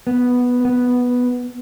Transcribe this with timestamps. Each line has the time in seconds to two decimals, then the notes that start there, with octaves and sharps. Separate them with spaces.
0.07 B3
0.65 B3